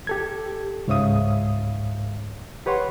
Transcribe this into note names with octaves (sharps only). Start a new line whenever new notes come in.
G4 A4 G#6
C#2 G#2 C#5 E5 F5 D#6
G4 B4 C#5 F#5 C6